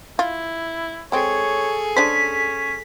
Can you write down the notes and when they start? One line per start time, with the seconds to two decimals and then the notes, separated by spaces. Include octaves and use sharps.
0.19 E4 F4
1.12 G#3 C4 G#4 A4 C#5
1.96 G#3 C#4 D4 C5 B6